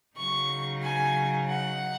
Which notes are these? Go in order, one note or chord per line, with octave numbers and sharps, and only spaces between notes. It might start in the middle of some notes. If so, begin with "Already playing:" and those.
C#3 F#3 D#4 C#6
G#5
F#5